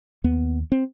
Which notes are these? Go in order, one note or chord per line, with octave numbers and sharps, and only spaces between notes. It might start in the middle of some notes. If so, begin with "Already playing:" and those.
D#2 B3
C4